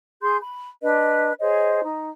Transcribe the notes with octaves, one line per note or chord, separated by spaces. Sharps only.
G#4 C6 G6
B5
D4 B4 D#5
G#4 C5 C#5 D#5
D#4